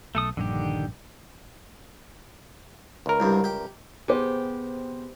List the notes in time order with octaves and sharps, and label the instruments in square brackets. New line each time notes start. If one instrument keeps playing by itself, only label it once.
[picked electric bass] B1 [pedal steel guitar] A3 A4 D#6
[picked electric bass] A#1 G2 [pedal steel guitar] D3 D#3 G4
[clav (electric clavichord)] C#2 A#4
[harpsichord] C2 G2
G4
[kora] C3 G4 [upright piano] B3 G#4 C5